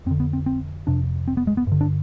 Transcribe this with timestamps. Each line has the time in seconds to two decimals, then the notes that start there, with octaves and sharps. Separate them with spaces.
0.06 F2 C4
0.11 D3
0.20 B3
0.33 C4
0.46 C4
0.87 F2 C3 D4
1.28 C4
1.37 B3
1.47 G#3
1.57 B3
1.67 G2 D3
1.81 D4